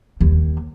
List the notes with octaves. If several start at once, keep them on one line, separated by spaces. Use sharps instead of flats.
D#2